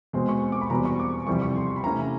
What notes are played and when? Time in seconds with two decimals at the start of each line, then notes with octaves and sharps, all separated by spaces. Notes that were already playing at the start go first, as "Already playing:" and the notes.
0.13 B2 G#3 C4 C6
0.29 C#6
0.52 D6
0.61 B5
0.70 E2 B2 G3 C4 A#5
0.85 C#6
1.00 D6
1.27 F2 C3 E3 G3 C#6
1.42 C#6
1.56 C6
1.76 B5
1.83 C3 E3 A3 C#4 A#5